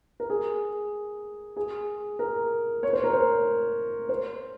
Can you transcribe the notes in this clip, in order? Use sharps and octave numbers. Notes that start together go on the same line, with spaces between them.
A#4
G#4
G#4
A#4
C#5
C5
A#4
C5
C5